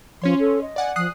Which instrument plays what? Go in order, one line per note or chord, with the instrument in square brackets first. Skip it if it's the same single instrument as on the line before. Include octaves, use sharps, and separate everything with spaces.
[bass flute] F3 [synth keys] C#4 C#5 C6
[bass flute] A4
D#5
[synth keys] D5 F#5 G#5
[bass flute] F3 [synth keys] D#6 F#6 C7